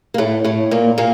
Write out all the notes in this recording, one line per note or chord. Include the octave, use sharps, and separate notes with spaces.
A#3
A2 A3
A2 A3
A#2 A#3
A#2 A#3